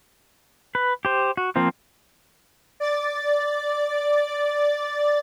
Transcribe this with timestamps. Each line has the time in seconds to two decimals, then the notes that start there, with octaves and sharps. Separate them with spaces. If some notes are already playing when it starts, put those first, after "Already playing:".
0.75 B4
1.05 G4 C5
1.37 F#4
1.56 F3 A#3 C4 F4
2.80 D5 A6